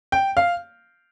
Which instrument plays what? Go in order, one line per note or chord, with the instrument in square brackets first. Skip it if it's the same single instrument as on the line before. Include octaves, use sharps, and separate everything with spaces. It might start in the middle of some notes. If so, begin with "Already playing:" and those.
[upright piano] G5
F5